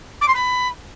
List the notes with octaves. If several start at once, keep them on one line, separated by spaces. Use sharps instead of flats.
D6
C6
B5